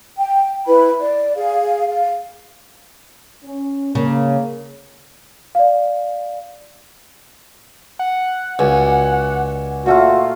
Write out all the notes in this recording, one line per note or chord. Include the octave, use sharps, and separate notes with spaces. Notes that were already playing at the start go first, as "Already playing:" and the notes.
G5
E4 B4 B5
D5
G#4 F5
F5
C#4
C#3 A#3
D5 F5
F#5
C#2 F#4 D5 G#5
A#2 A3 F4 F#4